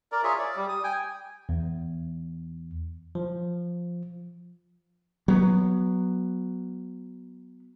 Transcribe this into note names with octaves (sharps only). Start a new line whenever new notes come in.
A#4 D5
F4 G#4 C#5 E5
D5
G3
D#6
G5 G#5
E2
F3
F#3 B3